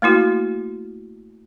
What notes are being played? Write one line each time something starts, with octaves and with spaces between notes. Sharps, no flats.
A3 A#3 E4 F#4